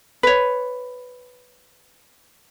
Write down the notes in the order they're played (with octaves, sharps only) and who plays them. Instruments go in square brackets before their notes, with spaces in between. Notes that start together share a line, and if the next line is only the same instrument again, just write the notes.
[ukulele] B4 C#5